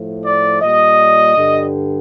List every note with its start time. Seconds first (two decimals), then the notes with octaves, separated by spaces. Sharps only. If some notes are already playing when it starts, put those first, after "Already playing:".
Already playing: A2 F3
0.25 D5
0.62 A#2 G3 D#5
1.36 G2 D3 G3